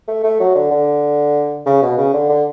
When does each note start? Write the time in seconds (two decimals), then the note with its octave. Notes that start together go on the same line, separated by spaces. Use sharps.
0.08 A3
0.24 A3
0.40 F#3
0.55 D3
0.71 D3
1.66 C#3
1.82 B2
1.98 C#3
2.13 D3
2.29 D3